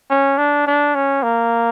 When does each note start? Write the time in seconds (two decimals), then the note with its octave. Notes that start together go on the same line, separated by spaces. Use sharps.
0.11 C#4
0.38 D4
0.67 D4
0.95 C#4
1.23 A#3